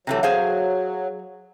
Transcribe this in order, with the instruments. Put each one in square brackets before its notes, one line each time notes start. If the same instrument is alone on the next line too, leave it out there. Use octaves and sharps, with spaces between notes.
[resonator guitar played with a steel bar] C3 E3 A3 [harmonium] F#3
[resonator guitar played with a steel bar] G#4 C5 F5